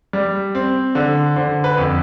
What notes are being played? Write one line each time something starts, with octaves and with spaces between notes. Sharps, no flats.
G3
C4
D3
D3 C5
B4
F2